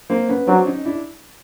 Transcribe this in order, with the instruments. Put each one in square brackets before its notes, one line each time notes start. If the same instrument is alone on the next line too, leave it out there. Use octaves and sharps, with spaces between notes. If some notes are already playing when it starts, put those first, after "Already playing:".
[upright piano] A#3 C4
B3 C#4
[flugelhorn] F#3 [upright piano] C4 D4
[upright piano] C#4 D#4
D4 E4